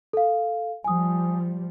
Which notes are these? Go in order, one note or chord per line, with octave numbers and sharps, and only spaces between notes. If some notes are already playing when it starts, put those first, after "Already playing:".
A4 F5
F3 G3 G#5 D#6